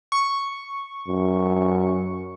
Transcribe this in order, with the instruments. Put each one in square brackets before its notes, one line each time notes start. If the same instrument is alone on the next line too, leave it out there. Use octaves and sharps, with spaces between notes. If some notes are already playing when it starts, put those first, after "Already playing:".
[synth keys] C#6
[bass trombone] F#2